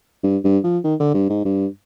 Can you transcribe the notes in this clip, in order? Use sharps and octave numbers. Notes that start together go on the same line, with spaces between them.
G2
G2
F3
D#3
D3
G2
G#2
G2